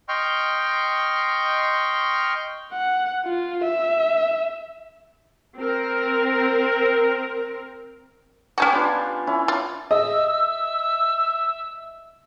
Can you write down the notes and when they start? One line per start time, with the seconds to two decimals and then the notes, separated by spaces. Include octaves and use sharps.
0.09 D#5 G5 C6 C#6 F6 G6
2.73 F#5
3.25 F4
3.64 E5
5.57 C4 A#4
8.58 C#4 D#4 F#4 G4 G#5
8.72 B3 D4 F4
9.27 C#4 E4
9.48 F4
9.91 D#5 E5 E6